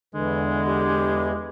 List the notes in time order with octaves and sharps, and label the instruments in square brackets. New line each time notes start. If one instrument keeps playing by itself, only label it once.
[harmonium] E2 E3 [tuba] D3 [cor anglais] G#3
[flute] G4